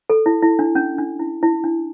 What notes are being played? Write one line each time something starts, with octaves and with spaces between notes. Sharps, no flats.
A4
E4
E4
D4
C#4
D4
E4
E4
D4